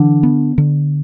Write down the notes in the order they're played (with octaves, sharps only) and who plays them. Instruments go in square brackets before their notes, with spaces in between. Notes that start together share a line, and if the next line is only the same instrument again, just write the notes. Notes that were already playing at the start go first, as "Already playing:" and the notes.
Already playing: [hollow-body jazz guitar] D3 [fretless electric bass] E3
[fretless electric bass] B3
D3